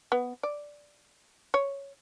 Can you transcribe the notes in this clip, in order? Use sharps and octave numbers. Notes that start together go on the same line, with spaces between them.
B3
D5
C#5